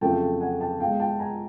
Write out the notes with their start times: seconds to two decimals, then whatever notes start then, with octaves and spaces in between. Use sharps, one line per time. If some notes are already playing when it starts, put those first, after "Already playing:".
0.01 F2 C#3 F#3 A3 G5 A5
0.40 F#5 G#5
0.61 G5 A5
0.80 B2 G#3 F5 G5
0.99 G5 A5
1.19 G#5 A#5